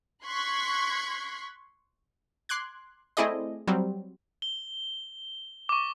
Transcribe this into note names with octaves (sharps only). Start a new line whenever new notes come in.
C6 C#6 F#6 G#6 B6
C6 D6 F#6 G#6
A3 C4 E4 G#4 D5 D#5
F#3 G3 C4
G7
C#6 D6